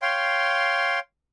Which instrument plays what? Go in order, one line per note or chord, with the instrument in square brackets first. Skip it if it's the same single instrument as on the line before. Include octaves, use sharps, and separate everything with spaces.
[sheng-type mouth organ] C#5 F5 G5 C6